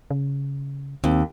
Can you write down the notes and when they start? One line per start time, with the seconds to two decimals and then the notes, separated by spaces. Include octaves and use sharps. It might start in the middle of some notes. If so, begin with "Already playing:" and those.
0.11 C#3
1.04 D#2 C4